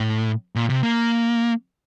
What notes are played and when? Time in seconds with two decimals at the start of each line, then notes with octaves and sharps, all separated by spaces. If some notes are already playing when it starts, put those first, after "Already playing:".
Already playing: A2
0.55 A#2
0.70 C3
0.83 A#3